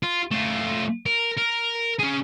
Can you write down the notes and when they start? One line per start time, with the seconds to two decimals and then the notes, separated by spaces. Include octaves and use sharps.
0.03 F4
0.31 A3 F4
1.06 A#4
1.37 A#4
1.99 C#4 G#4